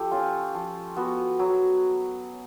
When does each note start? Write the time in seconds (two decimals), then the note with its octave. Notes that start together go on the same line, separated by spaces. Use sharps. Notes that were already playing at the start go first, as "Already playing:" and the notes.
Already playing: F3 G4 A4
0.11 C#4 F4
0.55 F3
0.96 B3 F#4
1.39 F#3